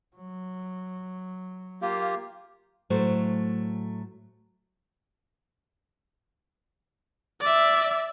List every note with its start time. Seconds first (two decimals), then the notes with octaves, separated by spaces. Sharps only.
0.16 F#3
1.82 A#3 F4 G4 F5
2.90 A2 F#3 A3 C5
7.41 D5 E5